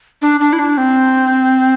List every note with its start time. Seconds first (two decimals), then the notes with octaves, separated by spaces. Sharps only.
0.22 D4
0.40 D4
0.53 E4
0.59 D4
0.78 C4